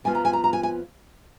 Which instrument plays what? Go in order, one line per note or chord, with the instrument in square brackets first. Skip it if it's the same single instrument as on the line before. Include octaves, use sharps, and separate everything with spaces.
[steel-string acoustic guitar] F2 F3 B3 F4 G#5
A#5
G#5
A#5
A#5
G#5
G#5